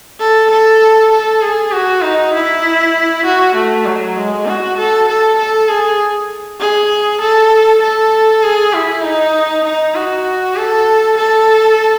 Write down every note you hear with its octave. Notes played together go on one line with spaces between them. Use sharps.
A4
A4
A4
G#4
F#4
D#4
E4
F#4
A3
F#3
G#3
F#4
A4
A4
A4
G#4
G#4
A4
A4
G#4
E4
D#4
D#4
F#4
A4
A4